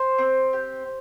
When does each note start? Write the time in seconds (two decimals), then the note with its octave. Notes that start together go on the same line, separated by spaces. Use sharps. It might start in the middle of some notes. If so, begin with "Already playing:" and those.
Already playing: C5
0.18 C4
0.53 G4